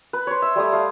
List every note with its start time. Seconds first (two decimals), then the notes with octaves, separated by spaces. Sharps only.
0.13 B4
0.27 C5 C#5
0.42 E5
0.56 G3 A3 D#6
0.72 A3 F5